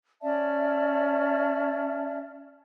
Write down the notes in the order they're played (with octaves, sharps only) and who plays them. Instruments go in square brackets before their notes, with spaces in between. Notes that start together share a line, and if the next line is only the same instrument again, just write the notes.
[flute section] C#4 D5 E5 A5